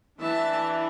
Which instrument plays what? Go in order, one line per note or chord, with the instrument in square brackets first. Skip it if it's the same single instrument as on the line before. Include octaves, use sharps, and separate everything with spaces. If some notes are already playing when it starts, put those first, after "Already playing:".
[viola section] E3 D4 E5 A5